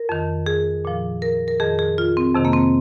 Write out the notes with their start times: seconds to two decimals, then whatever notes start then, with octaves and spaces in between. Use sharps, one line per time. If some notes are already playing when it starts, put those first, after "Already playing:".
Already playing: A#4
0.09 F2 D#3
0.46 G#4
0.85 A#2 F3
1.22 A#4
1.48 A#4
1.60 F2 D#3 G#4
1.79 G#4
1.98 F4
2.17 C4
2.35 F2 C3 D#3
2.45 A#3
2.53 C4